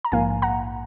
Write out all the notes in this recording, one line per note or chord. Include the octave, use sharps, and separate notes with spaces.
A#5
A#1 G#2 F3 A#3 F5 G#5
F#5 A#5